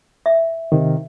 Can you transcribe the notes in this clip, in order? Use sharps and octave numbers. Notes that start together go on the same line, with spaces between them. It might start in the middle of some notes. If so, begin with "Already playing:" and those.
E5
C3 D#3